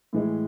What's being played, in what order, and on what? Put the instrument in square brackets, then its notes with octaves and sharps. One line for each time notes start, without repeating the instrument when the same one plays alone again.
[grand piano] A2 E3 G#3